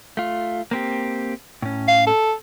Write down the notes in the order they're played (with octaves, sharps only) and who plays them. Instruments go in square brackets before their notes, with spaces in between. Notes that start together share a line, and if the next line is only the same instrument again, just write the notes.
[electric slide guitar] A3 F4
A#3 C4 G4
A2 C#4
[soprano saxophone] F5
A4